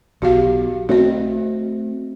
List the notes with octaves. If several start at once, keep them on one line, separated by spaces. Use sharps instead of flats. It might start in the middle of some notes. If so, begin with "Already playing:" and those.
B1 F#4 G4 F5
A3 C4 F#4 D#5